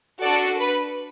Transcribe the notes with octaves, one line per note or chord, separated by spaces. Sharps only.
D4 F#4 A4 D5
B4